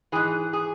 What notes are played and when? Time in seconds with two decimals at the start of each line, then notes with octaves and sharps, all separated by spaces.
0.12 G#2 E3 G#4
0.53 G#4